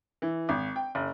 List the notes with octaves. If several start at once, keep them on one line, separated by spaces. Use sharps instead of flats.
E3
G#1
G5
F#1